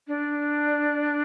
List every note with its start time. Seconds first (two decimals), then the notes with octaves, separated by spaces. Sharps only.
0.08 D4